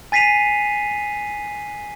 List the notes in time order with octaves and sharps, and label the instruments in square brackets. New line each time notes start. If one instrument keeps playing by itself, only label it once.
[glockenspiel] G#5 A6 B6 C7 D#7 F7